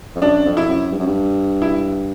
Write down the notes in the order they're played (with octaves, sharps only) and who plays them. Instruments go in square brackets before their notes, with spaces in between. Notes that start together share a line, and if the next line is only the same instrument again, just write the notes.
[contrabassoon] F2
[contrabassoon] F#2 [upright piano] D4
[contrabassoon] F2
[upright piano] E4
[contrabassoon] F#2
G2
F#2
G2
[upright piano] E4